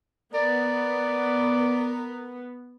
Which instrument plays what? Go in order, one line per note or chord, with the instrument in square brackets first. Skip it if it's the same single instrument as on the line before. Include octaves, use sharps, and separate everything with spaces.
[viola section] B3 [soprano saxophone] A#4 [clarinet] D5